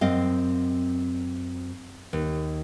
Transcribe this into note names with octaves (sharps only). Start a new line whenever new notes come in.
F#2 C4 D#5 F5
D#2